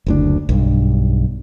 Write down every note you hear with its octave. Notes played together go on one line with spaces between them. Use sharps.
F#1 D2 D4
B1 G2